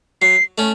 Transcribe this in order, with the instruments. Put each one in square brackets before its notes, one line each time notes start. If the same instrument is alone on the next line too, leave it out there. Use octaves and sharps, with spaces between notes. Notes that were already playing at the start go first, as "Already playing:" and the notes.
[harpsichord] F#3 [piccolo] C7
[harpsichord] A3 C#4